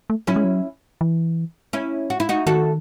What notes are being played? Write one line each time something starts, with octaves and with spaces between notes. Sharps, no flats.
A3
F#3 C#4 E4
G#3
F#3
E3
C#4 E4
F#4
E4
D#4 F#4
D#3 F#4 A4